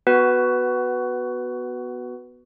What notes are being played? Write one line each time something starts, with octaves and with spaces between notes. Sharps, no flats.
B3 F#4 B4